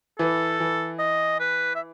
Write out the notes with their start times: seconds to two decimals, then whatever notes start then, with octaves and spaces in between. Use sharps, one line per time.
0.19 E3 A4
0.60 E3
0.99 D#5
1.40 B4
1.76 E5